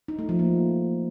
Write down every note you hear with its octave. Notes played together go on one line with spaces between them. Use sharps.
D#4
A3
F3
A#3